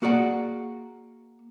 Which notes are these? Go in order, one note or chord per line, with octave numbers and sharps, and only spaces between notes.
A#3 F#4 G#4 D5 F#5